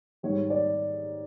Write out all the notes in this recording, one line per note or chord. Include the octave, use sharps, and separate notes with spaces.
G#2 D#3 G3 C#5
D5